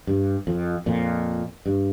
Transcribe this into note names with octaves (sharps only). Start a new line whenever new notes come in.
G2
F2
F2 A#2
G2